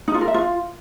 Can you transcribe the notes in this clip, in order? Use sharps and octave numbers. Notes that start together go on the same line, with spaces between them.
D#4
F4
A#4
E5
F4